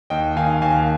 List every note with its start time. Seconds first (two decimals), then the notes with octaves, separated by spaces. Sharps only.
0.10 D#2 D#5 G5
0.37 D#3 F5 G#5
0.62 D#2 F5 G#5